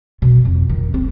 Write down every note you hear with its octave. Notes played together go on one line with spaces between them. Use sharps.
B2
F2
D#3
C4